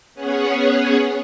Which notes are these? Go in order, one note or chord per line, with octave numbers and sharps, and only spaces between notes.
B3 C#4 G#4 C#5 F#5